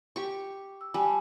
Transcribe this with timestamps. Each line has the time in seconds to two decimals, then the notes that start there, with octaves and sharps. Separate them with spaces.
0.16 G4 C#6
0.81 E6
0.94 G3 G#5 A5